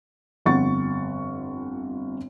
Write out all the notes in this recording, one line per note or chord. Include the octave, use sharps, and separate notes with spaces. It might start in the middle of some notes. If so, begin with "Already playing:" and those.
G1 F2 F#5 C#6 A6